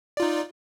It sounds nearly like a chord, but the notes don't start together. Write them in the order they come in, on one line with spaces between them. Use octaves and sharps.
D5 F4 D#4